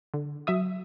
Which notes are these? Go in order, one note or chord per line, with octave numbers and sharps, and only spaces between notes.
D3
F#3 E5 D#6